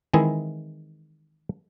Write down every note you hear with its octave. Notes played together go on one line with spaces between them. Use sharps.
D#3 E3 G#3 C4 E4 G#4